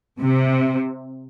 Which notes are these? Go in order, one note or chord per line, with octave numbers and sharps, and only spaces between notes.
C3